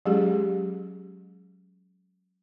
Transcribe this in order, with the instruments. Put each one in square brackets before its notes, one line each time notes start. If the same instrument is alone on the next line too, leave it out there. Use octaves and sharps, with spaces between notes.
[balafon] F#3 G#3 C#4 G4 G#4